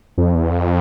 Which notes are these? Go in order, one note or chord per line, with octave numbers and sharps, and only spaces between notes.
F2
E2
F2